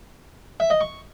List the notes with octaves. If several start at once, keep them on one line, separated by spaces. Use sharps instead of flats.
E5
D#5
C#6